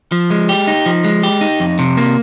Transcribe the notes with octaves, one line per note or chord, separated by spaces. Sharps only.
F3
G#3
G4
D#4
F3
G#3
G4
D#4
F2
C3
A#3